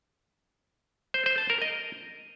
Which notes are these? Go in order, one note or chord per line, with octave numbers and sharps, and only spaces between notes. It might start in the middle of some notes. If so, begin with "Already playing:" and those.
C5
C5
A5
A#4
D#5